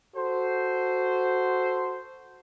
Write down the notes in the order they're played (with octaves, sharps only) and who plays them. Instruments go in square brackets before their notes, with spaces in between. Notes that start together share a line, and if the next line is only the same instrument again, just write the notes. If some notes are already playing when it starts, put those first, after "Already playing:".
[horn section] F#4 A4 C5